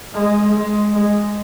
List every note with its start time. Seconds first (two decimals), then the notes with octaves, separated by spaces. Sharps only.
0.14 G#3
0.52 G#3
0.92 G#3